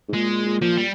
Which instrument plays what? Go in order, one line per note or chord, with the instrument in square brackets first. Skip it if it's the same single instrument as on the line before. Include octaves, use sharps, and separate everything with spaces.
[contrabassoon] G#2
[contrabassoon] A#2 [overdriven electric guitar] G#3
[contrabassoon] A#2
A#2
[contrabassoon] A#2 [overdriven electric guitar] F3
[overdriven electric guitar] G3